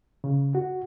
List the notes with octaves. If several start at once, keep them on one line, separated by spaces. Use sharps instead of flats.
C#3
F#4